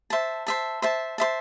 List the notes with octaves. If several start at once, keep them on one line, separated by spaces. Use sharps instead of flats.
C5 E5 A5
C5 E5 A5
C5 E5 A5
C5 E5 A5